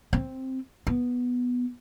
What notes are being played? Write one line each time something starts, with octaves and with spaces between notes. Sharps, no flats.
C4
B3